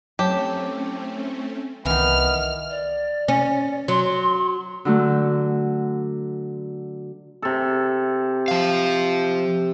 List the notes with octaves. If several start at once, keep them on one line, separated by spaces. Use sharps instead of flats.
F#3 A3 C4 C#4 E4 G4 A5
C2 D#3 E3 B3 F6
D5
C#4
F#3 C6
D3 F#3 A3
C3 A4
F3 F5